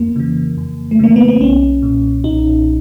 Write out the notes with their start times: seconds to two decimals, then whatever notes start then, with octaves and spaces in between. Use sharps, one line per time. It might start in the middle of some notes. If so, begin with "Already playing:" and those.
Already playing: F2 A#3
0.16 C#3 E3
0.57 F2
0.91 A3
0.99 C#3 E3 A#3
1.16 B3
1.28 C4
1.41 B1 C#4
1.82 A#2
2.24 B1 D#4